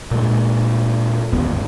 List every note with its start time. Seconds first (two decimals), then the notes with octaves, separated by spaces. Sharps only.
0.11 A#2 G#3
1.33 G1 D#2 G#2 B3